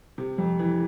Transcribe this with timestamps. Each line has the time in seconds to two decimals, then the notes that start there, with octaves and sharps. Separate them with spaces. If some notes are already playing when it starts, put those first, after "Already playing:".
0.18 C3
0.38 F2
0.59 E3